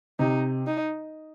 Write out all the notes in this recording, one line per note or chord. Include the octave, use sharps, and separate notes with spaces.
C3 D#4
D#4